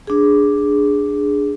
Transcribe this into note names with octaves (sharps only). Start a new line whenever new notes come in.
D4 G#4